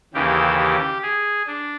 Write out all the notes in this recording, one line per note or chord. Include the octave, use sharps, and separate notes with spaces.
D#2 C#3 E3 G4
G4
G#4
D4